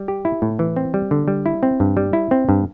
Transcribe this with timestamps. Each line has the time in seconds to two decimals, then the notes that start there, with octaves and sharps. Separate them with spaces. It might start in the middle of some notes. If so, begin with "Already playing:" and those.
Already playing: G3
0.08 G4
0.25 E4
0.42 A2
0.59 E3
0.76 C4
0.94 G3
1.11 D3
1.28 G3
1.46 E4
1.63 C4
1.80 G2
1.97 G3
2.13 E4
2.31 C4
2.49 G2